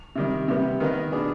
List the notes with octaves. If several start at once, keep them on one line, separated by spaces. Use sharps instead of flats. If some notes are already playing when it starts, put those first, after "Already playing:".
C3 D#3 G3
C3 G3 B3
D#3 B3 D#4 B4 D#5
B2 B3 D4 G#4